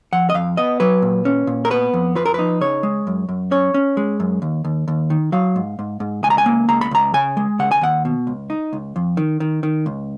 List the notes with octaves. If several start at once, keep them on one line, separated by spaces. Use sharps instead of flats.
F3 F#5
D#5
F2 F5
B3 D#5
F#3 B4
A#2
C#4
A#2
A#4
B3 B4
F2
F3 B4
A#4
D#4 B4
C#3 C#5
G#3
F#2
F#2
C#4 C#5
C#4
G#3
F#2
D#2
D#2
D#2
D#3
F#3 F5
G#2
G#2
G#2
C#2 G#5
A#5
G#5
A#3
C#2 A#5
B5
C#2 A#5
C#3 G#5
G#3
C#3 F#5
G#5
D#2 F#5
B2
C#2
D#4
C#2
F2
D#3
D#3
D#3
C#2